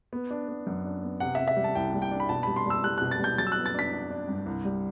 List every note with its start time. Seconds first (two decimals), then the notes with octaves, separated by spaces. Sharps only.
0.13 B3
0.30 D4
0.48 B3
0.67 F#2
0.85 D4
1.03 B3
1.20 C3 F#5
1.35 E5
1.39 C3
1.48 E5
1.57 G3
1.64 A5
1.75 C2 G5
1.94 G3
2.02 G5
2.11 D4
2.20 B5
2.29 B2 A5
2.43 G3 B5
2.56 C6
2.66 G3 E6
2.84 G3 F#6
2.98 B2 F#6
3.11 A6
3.19 G3 G6
3.38 F#3 A6
3.47 E6
3.52 B3 F#6
3.66 A6
3.74 D4 B6
3.93 D4
4.10 D4
4.29 G2
4.46 C2
4.65 G3